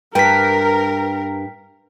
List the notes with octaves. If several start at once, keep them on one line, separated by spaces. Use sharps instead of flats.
G2 A#4 B4 G5 B6